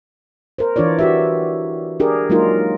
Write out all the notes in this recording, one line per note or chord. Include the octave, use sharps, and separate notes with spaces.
A#4 C5
E3 D4 F4 C#5 D5
F#4 G4 E5
D4 G4 G#4 A#4
F#3 G#3 A#3 D#4 F4 A#4